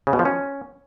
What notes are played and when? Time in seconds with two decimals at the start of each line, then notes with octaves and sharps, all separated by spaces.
0.07 C#3
0.13 B2
0.19 F3
0.25 C#4